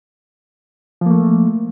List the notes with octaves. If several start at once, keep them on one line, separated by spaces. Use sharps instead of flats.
F3 A3 A#3